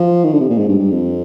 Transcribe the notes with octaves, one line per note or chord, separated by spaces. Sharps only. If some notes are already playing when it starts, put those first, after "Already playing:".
Already playing: F3
D#3
D3
C3
A#2
G#2
G2
G2
F2